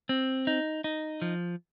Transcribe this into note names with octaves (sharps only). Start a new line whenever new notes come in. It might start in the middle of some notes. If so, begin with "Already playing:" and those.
C4
D#4
D#4
F3